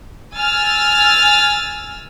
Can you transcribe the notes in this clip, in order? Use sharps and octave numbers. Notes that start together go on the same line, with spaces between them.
G#5 E6 F6 A6